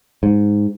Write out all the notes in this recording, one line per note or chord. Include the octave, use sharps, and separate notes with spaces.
G#2